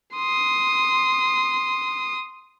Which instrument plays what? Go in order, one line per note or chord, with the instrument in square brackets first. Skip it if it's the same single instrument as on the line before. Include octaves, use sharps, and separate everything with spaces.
[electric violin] C6 D#6